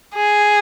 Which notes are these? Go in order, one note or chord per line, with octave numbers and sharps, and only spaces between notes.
G#4